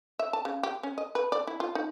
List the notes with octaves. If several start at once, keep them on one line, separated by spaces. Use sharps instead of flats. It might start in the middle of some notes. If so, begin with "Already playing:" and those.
E5
A5
C#3
G4
C#4
D#5
B4
D5
E4
F4
D#4